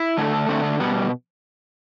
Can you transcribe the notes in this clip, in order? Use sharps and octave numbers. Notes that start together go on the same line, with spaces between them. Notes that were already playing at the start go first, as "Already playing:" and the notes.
Already playing: E4
D3 A3
D3 A3 C4
A3
B2 G3 B3